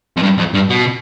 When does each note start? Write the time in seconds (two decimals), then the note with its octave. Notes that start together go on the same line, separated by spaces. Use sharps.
0.17 F2
0.22 G2
0.38 F2
0.54 G2
0.70 B2